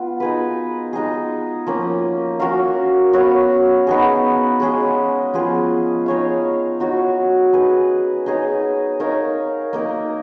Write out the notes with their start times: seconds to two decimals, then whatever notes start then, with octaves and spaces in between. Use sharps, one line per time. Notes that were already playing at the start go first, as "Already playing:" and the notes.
Already playing: B3 F4
0.20 D#4 G#4 B4
0.93 G#3 D#4 G#4
1.67 F3 A#3 C#4
2.40 C#4 F#4 A#4 F5
3.13 B3 F#4 C#5 F5
3.87 B3 D#4 G#4
4.60 G#3 C#4 G#4
5.34 F3 B3 F4 G#4
6.06 D#4 G#4 C#5 F5
6.80 D#4 F#4 C#5
7.53 D#4 G#4 B4
8.26 D#4 G#4 C#5
9.00 D#4 A#4 C#5 F5
9.73 A#3 D#4 A#4